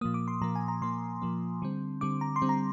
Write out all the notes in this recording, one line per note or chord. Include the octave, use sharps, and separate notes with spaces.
A#2 F3 A#3 D#6
D6
C6
A#2 F3 A#3 A#5
G#5
A#5
A#2 F3 A#3 C6
A#2 F3 A#3
D3 G3 C4
D3 G3 C4 D6
A#5
C6
D3 G3 C4
A#5